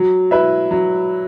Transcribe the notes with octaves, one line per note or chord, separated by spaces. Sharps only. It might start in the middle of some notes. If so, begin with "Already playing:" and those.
Already playing: F#3
E4 B4 E5
F#3